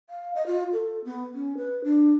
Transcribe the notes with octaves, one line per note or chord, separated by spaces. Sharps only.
F5
D#5
F4
A4
B3
C#4
B4
D4